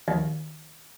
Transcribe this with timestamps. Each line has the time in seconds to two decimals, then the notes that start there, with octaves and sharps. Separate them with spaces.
0.08 D#2